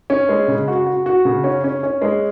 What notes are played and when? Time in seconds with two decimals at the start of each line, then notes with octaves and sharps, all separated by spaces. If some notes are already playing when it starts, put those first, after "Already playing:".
0.10 C#4
0.29 G#3
0.48 C#3
0.68 F#4
0.86 F#4
1.06 F#4
1.25 C#3
1.44 C#4
1.64 C#4
1.83 C#4
2.02 G#3